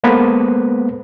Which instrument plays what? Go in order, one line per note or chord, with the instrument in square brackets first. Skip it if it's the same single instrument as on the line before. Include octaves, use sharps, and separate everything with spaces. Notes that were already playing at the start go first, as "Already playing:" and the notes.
[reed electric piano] G#3 A#3 B3 A4 B4 C5